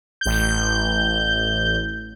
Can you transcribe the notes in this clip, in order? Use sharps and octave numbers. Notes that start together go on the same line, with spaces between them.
A1 G6